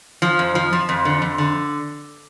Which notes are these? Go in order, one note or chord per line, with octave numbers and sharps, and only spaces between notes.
F3
F2
F3
F3
F2
D3
F2
D3